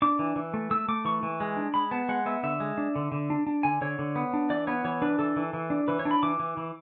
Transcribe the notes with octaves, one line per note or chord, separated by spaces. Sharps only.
D4 D6
E3
E3
A3
A3 E6
A3 D6
E3 C#6
E3
G#3
D4
G#3 B5
B3 A5
G#3 F#5
B3 E5
D3 E5
G#3
D4
D3
D3
D4
D4
D3 G#5
D3 C#5
D3
B3
D4
E3 D5
B3 C#5
E3 C#5
D4 B4
E3 A4
E3
E3
D4
E3 B4
C#5
D4
B5
E3 D6
E3
E3